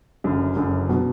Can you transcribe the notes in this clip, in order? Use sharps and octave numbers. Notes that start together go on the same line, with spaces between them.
F#1 F#2 D3
F#1 F#2 D3
B2 F#3